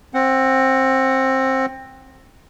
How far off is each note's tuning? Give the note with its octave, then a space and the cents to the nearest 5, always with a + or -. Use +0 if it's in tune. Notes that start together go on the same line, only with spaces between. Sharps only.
C4 +20 F#5 +0